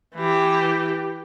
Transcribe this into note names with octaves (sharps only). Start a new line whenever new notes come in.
E3 G4